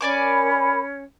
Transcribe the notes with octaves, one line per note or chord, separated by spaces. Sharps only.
C#4 A#4 D5 G#5 B5 D6